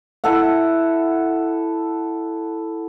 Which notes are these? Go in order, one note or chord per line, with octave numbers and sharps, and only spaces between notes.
E4 A4 F#5